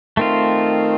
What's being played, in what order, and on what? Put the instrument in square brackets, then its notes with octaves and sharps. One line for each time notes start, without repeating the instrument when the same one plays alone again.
[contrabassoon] D#3 [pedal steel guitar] A3 C4 F4